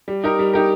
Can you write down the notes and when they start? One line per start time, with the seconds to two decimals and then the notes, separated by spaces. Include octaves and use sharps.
0.08 G3
0.24 D#4 G4 A#4
0.39 G3
0.53 D#4 G4 A#4